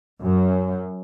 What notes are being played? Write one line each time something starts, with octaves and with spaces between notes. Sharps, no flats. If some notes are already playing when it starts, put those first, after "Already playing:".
F#2